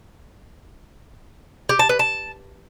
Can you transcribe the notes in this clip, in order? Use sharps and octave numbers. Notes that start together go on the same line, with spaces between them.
G4
A5
B4
A5